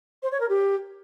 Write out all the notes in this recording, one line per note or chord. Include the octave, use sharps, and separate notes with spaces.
C5
C#5
A#4
G4